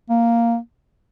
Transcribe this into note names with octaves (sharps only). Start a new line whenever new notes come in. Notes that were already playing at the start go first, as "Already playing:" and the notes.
A#3